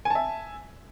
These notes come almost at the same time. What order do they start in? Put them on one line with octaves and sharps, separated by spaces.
G#5 A5 E5